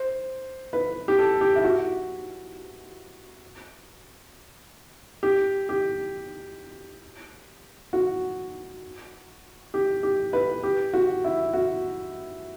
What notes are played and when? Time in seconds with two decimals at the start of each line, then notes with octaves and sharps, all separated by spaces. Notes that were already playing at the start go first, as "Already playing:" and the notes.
Already playing: C5
0.73 B4
1.08 G4
1.19 A4
1.41 G4
1.56 E4
1.64 F#4
5.23 G4
5.69 G4
7.93 F#4
9.74 G4
10.03 G4
10.33 B4
10.63 G4
10.94 F#4
11.24 E4
11.53 F#4